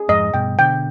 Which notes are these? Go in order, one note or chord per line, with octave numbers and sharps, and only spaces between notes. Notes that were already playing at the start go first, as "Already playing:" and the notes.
Already playing: G#4
F2 G#2 D#5
G2 B2 G5
B2 D3 G5